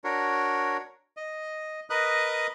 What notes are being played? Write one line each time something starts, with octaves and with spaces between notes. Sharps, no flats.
D4 F#4 A#4 C#5
D#5
A#4 B4 D#5 D#6 F#6